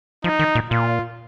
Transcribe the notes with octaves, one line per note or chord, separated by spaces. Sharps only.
F3 D#4
D#3
A#2
A#2 F4